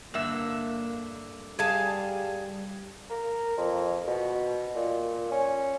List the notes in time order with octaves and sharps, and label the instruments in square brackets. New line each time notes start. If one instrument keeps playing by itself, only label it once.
[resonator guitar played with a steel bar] G2 D3 E5 [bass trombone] A#3
[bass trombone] G3 [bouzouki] G#4 F5 A5
[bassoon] A#4
F2
B2
A#2
C#4